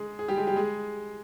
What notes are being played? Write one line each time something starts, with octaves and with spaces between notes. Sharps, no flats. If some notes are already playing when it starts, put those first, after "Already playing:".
Already playing: G#3 G#4
G#4
G3 G4
G#3 G#4
G3 G4
G#3 G#4